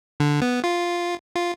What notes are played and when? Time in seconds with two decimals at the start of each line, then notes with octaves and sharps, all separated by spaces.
0.20 D3
0.42 B3
0.64 F4
1.36 F4